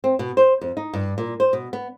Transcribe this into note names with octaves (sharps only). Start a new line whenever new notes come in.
C4
B2
C5
F2
D#4
G2
A#2
C5
B2
B3